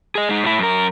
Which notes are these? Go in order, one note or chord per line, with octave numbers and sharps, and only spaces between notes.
G#4 D#5
G#3 D#4
A2 E4
F#2 A#4